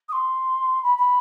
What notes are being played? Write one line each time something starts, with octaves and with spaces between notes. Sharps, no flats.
D#6
C6
B5
B5